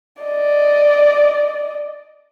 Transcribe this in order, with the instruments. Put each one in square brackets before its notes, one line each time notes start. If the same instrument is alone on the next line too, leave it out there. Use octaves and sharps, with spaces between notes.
[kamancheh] D5 D#5